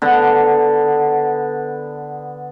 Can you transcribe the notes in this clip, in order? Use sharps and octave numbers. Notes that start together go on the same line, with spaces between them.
D3 B3